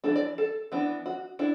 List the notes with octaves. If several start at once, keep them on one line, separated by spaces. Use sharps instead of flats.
E3 A3 D4 A4
D5
A4
E3 B3 D4
F#4
D4 E4